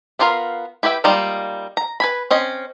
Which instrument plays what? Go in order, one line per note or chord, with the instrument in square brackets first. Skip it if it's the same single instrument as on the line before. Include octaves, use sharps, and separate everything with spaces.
[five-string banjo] B3 D4 F4 A#4 F5
E4 G4 B4 E5 G5
G3 G#3 A#3 D#4 F4
A#5
B4 G#5 B5
C4 C#4 D#5